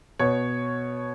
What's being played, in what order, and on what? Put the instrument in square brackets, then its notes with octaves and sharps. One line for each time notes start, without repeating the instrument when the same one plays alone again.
[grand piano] B2 C#5